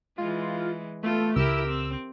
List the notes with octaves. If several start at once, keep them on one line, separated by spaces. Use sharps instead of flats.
E3 G#3 F4
A3 B3 F4 A4
C#2 E4 G4 A#4 E6
C4